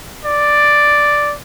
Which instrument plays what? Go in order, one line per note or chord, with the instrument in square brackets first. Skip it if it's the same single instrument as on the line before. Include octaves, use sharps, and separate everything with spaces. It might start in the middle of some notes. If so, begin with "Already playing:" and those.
[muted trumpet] D5